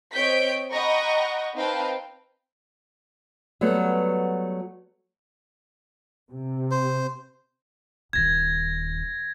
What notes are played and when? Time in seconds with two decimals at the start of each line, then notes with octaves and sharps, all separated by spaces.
0.13 C4 C#5 D#5 G6 B6 D7
0.71 D#5 F#5 G5 A#5 B5 C#6
1.55 C4 D#4 B4 F5 G5 A5
3.61 F#3 G3 A3 B3
6.31 C3
6.71 C5
8.13 D#1 D#3 G#6 A#6